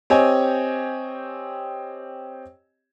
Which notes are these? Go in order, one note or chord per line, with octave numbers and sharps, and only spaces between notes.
C4 G4 C#5 D#5 G#5